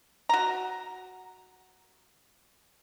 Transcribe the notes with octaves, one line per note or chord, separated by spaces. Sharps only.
F#4 A#5